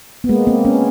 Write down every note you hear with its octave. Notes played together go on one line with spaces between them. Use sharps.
B3
G#3 A#3
A#3 C4
B3 C#4